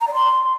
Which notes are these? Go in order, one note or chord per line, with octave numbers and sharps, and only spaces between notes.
A#5
D5
C6